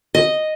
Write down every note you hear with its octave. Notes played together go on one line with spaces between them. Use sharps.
D#5